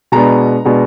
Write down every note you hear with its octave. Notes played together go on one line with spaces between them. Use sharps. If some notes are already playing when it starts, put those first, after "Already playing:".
B2 G#3 B3 D4 A#5
B2 G#3 B3 D4